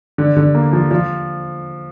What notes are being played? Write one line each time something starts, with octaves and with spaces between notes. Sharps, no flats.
D3
D3
A#3
F3
F3